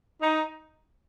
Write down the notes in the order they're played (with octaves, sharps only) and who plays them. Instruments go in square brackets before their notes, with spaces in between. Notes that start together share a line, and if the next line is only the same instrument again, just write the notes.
[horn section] D#4